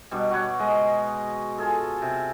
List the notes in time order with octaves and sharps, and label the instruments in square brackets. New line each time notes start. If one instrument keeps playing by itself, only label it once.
[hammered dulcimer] B2 G3 D4
F#4 B4 C#5 D5
G#3 D#5
F4 G#4 A4
C3